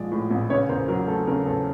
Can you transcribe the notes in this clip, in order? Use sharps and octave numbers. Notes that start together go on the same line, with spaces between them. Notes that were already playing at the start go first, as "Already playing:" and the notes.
Already playing: A#1 F3 G#3 D5
A2
A#1
C#3 B4 C#5
E2 A#4 C5
F#3 A#4
A3 A4
C#3 A#4
E2 A4